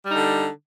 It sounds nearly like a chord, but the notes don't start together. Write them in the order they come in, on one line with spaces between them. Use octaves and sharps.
G3 D#4 D3